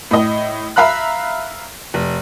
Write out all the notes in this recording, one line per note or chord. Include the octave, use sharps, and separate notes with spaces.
A2 D#5
E5 F5 A#5 B5 F#6
F1